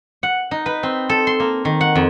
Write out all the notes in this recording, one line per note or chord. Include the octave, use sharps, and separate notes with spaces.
F#5
D#4
B4
C4
A4
C6
A#3
D#3
F#5
F2